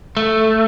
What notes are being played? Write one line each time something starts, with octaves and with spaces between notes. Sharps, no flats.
A3